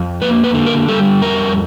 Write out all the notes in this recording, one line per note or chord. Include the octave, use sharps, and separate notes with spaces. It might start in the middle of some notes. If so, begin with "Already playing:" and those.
Already playing: F2
A#3 B4
B4
D3
A#4
G3 A4
F2 A#4